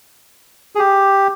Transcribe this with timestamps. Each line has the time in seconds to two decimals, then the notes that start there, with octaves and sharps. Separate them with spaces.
0.75 G#4
0.79 G4